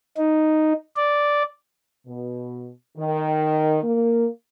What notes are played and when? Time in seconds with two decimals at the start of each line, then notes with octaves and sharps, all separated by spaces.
0.18 D#4
0.97 D5
2.06 B2
2.97 D#3
3.83 A#3